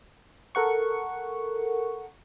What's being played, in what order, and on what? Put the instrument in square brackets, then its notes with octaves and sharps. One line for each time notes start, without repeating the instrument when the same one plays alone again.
[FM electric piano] A4 A#4 F#5 C#6